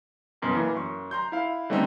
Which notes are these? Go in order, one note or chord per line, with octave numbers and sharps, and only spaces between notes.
C2 F#2 B2
E3 A#3
F#2 C#6
A#5 C6 G6
E4 F5
D3 G3 A3 C4 C#4 D#4